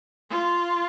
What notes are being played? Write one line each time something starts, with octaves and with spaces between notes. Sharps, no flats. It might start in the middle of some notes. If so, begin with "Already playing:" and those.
F4